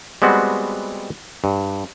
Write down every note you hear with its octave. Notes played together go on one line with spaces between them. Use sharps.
G3 G#3 B3 C4 F#4
G2